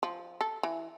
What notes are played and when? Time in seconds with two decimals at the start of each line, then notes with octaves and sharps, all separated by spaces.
0.03 F3
0.41 A4
0.63 E3